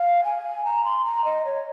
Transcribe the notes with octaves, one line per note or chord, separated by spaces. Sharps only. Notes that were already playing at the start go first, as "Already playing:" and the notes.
Already playing: F5
G#5
A#5
C6
A#5
D#5
C#5